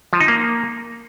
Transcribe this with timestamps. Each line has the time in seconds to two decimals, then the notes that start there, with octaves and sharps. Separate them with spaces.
0.13 F3
0.20 D#4
0.28 A#3